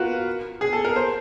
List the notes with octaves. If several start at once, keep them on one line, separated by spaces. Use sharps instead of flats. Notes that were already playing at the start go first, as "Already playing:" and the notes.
Already playing: F4 F#4 A#4 B4
G#4
A4
A#4
C5